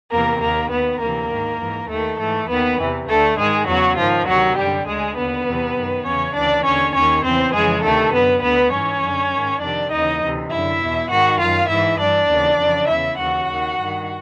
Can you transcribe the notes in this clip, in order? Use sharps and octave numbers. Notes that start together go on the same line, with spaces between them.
E2 C3 E3 A#3 A#4
D#2 D#3 A#3 A#4
D#2 D#3 B3 B4
D2 C3 E3 A#3 A#4
G#2 D#3
G#2 E3
D#2 D#3 A3 A4
G#2 E3 A3 A4
D#2 D#3 B3 B4
E2 C3 E3
D2 D3 A3 A4
G#2 D#3 G#3 G#4
E2 C#3 E3 F#3 F#4
G#2 D#3 F3 F4
D2 C3 D#3 F#3 F#4
F#2 D3 G3 G4
D2 D3 G#3 G#4
D#2 D3 B3 B4
E2 C3 E3
F#2 D#3
E2 C#3 E3 C#4 C#5
D2 C#3 E3 D4 D5
D#2 D3 C#4 C#5
D#2 D#3 C#4 C#5
E2 C#3 E3 C4 C5
F2 C#3 E3 G#3 G#4
D2 C3 D#3 A3 A4
F#2 D3 B3 B4
D2 D3 B3 B4
G#2 E3 C#4 C#5
F#2 D3
G#2 D#3
F2 C3 D#3 D4 D5
D#2 C#3 E3 D#4 D#5
D2 C3 E3
F#2 D3 E4 E5
E2 B2
G#2 D#3 F#4 F#5
F#2 D#3 F4 F5
G#2 E3 E4 E5
G2 E3 D4 D5
D#2 C#3 E3
F2 C#3 E3
E2 C#3 E3 E4 E5
D#2 C#3 E3 F#4 F#5
D#2 D#3
G2 D#3